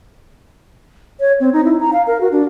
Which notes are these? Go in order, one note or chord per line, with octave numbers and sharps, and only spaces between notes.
C#5
C4
D#4
E4
A#5
F5
A#4
F#4
D4